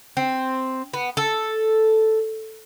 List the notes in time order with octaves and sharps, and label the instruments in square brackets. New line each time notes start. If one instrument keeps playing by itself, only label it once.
[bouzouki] C4
B3
A4